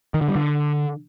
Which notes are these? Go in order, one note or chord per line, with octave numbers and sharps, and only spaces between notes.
D#3
D3
G3
D3